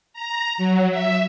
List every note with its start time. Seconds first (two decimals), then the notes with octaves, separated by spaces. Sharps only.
0.13 A#5
0.58 F#3
0.90 E5